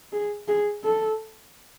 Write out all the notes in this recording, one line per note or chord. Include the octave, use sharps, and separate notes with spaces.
G#4
G#4
A4